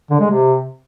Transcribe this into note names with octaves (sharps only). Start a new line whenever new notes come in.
D3
G#3
C3